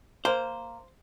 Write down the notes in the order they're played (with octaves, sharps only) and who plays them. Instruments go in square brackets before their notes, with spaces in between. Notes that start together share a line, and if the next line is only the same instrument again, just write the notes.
[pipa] A#3 [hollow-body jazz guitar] C5